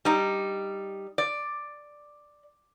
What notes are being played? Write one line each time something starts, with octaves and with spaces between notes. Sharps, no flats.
G3 D#4
D5